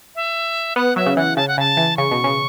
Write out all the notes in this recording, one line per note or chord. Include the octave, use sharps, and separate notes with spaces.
E5
B3 F#5
F#3 E5
C#3
E3 F#5
C#3 A5
F#5
C#3 A5
E3
C#3 C#6
B2
C#3